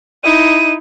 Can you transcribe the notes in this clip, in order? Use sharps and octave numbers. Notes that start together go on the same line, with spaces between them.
D#4 E4 D#7